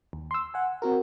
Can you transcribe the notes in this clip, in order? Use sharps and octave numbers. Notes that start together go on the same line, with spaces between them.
D#2
C6 E6
F#5 G#5
C4 F#4 A#4